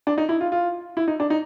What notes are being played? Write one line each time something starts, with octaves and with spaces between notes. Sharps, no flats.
D4
D#4
E4
F4
F4
E4
D#4
D4
D#4